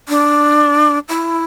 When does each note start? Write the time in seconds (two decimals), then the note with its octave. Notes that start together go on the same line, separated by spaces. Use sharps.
0.09 D4
1.09 E4